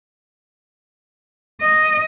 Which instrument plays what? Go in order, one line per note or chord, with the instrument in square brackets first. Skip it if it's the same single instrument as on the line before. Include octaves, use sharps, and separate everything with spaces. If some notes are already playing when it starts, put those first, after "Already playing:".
[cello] D#5